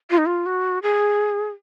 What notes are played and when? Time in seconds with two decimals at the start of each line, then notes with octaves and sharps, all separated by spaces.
0.11 F4
0.18 D#4
0.26 F4
0.46 F#4
0.83 G#4